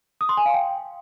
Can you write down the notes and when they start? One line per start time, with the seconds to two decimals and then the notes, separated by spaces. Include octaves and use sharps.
0.21 D#6
0.29 C6
0.37 G#5
0.46 F5
0.54 G5